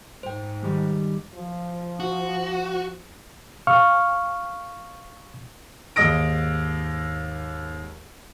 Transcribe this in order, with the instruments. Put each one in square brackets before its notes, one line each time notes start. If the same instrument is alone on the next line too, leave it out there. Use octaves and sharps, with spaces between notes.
[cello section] G#2 [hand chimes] C5 G5
[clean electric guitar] D#3 G3 G#3
[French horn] F3
[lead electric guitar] F#4
[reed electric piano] F5 C#6 F6
[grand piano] D#2 G#2 D#5 D#6 A#6 D7